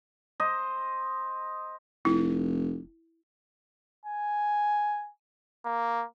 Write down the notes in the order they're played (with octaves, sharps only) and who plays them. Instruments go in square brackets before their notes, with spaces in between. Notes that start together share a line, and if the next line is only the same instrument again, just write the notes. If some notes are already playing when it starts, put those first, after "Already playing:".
[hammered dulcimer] C5 D#5
[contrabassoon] F1 [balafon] E4
[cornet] G#5
A#3